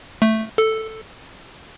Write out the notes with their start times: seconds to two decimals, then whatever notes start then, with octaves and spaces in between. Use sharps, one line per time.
0.22 A3
0.58 A4